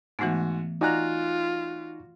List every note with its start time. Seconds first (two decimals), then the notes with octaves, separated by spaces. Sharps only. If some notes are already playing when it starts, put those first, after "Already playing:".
0.19 G#2 E3 A3 B3 F#4
0.81 D#4 F4 F#4 D5 G#5 A#5 F#6